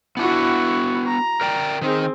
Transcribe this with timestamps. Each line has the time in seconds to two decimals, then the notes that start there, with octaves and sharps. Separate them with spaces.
0.17 B3 D4 E4 F#4 F#5
1.06 A#5
1.41 A#4 D5 G5
1.81 D#3 C4 D#4 G#4